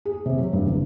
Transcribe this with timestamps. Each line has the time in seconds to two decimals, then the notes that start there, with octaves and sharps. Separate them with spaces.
0.05 G#4
0.26 C3
0.38 F#3
0.53 G2
0.66 F#1